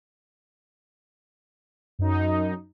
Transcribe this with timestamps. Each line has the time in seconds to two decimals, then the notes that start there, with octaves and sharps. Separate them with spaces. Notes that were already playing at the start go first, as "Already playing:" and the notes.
1.99 F#2 D#4